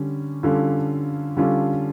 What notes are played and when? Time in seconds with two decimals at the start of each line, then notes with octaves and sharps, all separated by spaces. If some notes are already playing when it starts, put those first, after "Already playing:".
Already playing: D3 G3 C#4
0.43 D3 G3 C#4 F4 A4
1.37 D3 G3 C#4 F4 A4